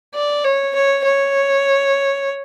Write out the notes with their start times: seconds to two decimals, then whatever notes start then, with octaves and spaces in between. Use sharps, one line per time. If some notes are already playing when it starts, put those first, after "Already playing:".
0.14 D5
0.45 C#5
0.75 C#5
1.04 C#5